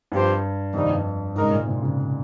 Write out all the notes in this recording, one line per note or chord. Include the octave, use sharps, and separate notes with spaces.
G2 F3 C4 G4 C5
F2 C3 D#3 G3 A#3 D#4
G2
G#2 C#3 G#3 D#4 A#4
A#2
C3
C#3